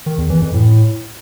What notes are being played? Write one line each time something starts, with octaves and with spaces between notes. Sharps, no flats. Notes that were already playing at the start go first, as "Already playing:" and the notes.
D#3
E2
E3
F2
A2